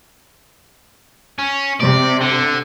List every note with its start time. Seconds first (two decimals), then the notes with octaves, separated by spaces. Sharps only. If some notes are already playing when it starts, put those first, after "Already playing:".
1.38 C#4
1.80 C3 D5
2.21 D3